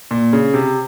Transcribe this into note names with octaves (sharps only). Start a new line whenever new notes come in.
A#2
C#3
C3